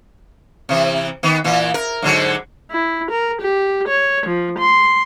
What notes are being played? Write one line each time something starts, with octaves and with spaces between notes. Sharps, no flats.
C3 E3
D#3 B3
A#2 E3
A#4
G#2 D3 F#3
E4
A#4
G4
C#5
F3
C6